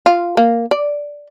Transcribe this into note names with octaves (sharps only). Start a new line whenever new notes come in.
F4
A#3
D5